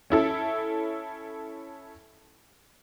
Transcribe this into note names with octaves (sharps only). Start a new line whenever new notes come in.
C#4 E4 A4